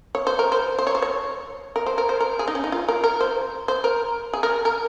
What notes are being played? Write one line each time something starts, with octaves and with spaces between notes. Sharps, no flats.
C#5
C5
A#4
C5
C5
C#5
C5
C#5
A#4
C5
A#4
C5
A#4
G#4
D#4
C#4
D#4
F4
A#4
A#4
C5
C5
A#4
G#4
A#4
A#4